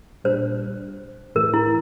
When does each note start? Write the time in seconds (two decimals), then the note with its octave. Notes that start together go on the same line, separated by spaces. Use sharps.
0.24 A#2 G3 D4 C5
1.35 A2 E3 A3 A#4
1.54 E4